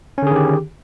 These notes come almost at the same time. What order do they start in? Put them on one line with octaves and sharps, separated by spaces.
C#4 D3 G#4 D#3 G4